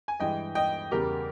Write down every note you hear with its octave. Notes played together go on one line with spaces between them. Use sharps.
G#5
G2 E3 G#3 D#5 G5
D#5 G5
E2 C#3 G3 G4 A#4